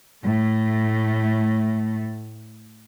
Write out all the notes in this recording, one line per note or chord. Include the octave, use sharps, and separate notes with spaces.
A2 A3